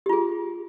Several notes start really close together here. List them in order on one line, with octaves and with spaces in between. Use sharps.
G4 F4 G#4